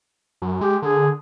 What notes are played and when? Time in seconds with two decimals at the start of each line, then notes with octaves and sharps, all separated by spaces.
0.42 F#2
0.61 G#3 G4
0.82 D3 G#4